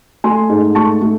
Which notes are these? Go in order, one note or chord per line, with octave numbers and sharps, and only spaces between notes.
A3 G#5 C6
G#2
A3 A5 C#6
A3